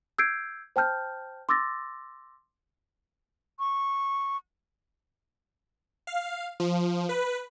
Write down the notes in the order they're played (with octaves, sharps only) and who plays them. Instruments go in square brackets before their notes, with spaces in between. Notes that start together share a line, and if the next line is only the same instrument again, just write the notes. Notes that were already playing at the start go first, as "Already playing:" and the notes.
[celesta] E6 G6 G#6 C7 D7
C5 G5 A5 F6 G6
C6 D6 E6 A6 A#6
[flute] C#6
[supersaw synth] F5
F3
B4